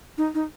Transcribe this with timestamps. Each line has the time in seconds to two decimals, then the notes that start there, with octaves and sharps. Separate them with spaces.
0.18 D#4
0.34 D#4